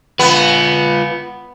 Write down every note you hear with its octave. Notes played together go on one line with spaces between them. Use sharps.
B3 F4 B4